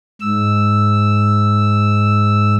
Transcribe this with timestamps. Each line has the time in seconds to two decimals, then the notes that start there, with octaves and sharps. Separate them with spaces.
0.21 G#2 E6